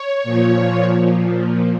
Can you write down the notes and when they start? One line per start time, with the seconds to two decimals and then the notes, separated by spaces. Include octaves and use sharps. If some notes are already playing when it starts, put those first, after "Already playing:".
Already playing: C#5
0.24 A#2 F3
0.95 A#2 F3